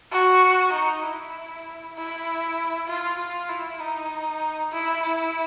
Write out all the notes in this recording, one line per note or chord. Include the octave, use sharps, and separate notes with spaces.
F#4
D#4
E4
E4
F4
F4
E4
D#4
E4
E4